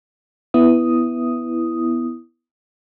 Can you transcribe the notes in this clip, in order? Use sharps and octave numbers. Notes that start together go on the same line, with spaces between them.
B3 E4 D#6